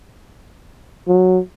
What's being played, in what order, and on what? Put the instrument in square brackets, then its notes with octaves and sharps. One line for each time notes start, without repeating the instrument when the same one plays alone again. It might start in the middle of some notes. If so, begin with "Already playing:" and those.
[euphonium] F#3